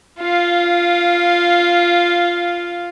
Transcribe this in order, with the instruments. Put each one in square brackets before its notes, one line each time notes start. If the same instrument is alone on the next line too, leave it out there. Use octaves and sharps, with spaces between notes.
[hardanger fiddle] F4 F5